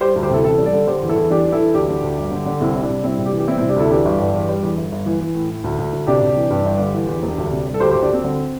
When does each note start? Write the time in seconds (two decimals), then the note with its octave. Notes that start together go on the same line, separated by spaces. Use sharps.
0.01 G3 G4 C5
0.16 D2
0.22 G4 C5
0.30 C3 E4 A4
0.44 A1 E4 A4
0.58 G3
0.66 A4 D5
0.73 D3
0.87 D3 G4 C5
1.02 E2
1.09 E4 A4
1.16 E2
1.30 E3 D4 G4
1.45 E3
1.52 E4 A4
1.60 E3
1.74 D2 D4 G4
1.88 D3
2.03 D2
2.18 G1
2.31 D3
2.46 D3
2.60 C2 C4 E4
2.75 G3 E4
2.82 D4
2.90 C3
3.03 G3 C4 E4
3.18 C3
3.25 D4 G4
3.33 E3
3.39 G4
3.48 G3 C4 E4
3.58 C3 C4 E4
3.69 D4 G4
3.76 D2 E4 A4
3.91 E3 D4 G4
4.05 G1
4.20 G2
4.34 E2
4.49 G3
4.63 E2
4.77 G1
4.92 G1
5.06 E3
5.21 E3
5.35 A2
5.50 A2
5.64 D2
5.79 D2
5.93 D2
6.07 C3 D4 G4
6.22 C3
6.36 E3
6.50 G2
6.65 G1
6.79 D3
6.94 E3
7.08 E2
7.23 E1
7.38 D2
7.52 C3
7.66 G3
7.74 A4
7.80 D2 G4 C5
7.91 G4 C5
7.95 D2
8.02 D4 G4
8.10 D2 C4
8.24 D3